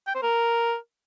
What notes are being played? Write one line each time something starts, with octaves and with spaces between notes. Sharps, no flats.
G5
C5
A#4